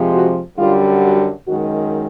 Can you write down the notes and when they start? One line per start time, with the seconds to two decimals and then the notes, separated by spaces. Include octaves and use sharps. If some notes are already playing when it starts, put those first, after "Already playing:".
Already playing: F2 C3 F3 G#3
0.12 F#4
0.57 F#2 D3 G3 F4
1.03 F#4
1.47 F#2 D#3 G#3 F#4